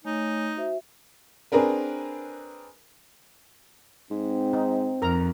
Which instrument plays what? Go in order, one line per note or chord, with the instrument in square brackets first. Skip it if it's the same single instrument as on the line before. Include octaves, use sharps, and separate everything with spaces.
[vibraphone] A3 C#5 G#5 [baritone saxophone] D#4
[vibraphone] F#4 C5 E5
[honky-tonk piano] C4 D4 G#4 A#4 B4
[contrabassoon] G#2 [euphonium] C4
[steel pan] D#4
[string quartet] F2 [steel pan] A#4 A#5